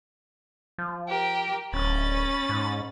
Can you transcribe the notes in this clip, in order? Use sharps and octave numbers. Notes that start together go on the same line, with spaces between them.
F3
G4 A#4
D1 C#4 B5 A6
G#2